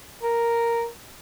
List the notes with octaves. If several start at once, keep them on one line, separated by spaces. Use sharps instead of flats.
A#4